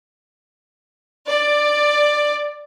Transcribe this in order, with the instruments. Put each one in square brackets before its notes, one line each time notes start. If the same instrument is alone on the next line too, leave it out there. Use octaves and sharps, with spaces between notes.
[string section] D5